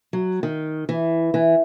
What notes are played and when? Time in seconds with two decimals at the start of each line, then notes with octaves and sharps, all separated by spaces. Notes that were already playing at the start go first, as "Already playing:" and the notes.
0.13 F#3
0.43 D#3
0.89 E3
1.34 E3